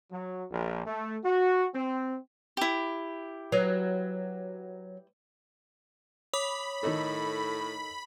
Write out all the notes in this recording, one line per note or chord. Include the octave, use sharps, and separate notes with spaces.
F#3
A#1
A3
F#4
C4
E4 G4
F#3 B4 C#5
C#5 B5 D6 D#6
A2 D#3 D#4 A4